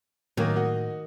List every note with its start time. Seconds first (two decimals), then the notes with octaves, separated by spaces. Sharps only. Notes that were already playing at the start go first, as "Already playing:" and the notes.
0.37 A2 D#3 F#3 A#3 G#5
0.56 F#4 D#5